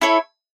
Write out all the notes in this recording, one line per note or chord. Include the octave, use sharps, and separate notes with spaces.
E4 A4 C#5